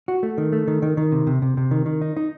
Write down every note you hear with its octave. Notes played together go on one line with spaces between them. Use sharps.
F#4
A3
D#3
A3
D#3
D#3
D#3
C3
C3
C3
C3
D#3
D#3
D#4
D#4